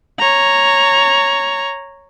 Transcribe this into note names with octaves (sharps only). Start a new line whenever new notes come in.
C#5 A#5